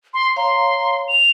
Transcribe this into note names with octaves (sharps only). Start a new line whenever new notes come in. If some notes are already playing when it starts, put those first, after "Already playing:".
C6
C#5 F5 A#5 C6
F7